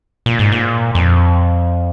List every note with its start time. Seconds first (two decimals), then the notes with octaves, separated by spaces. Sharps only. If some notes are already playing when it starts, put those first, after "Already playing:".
0.26 A#2
0.39 G#2
0.52 A#2
0.95 F2